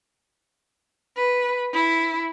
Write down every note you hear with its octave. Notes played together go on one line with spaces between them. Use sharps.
B4
E4